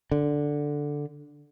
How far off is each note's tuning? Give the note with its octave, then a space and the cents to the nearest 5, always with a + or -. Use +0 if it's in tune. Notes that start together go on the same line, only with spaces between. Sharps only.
D3 +0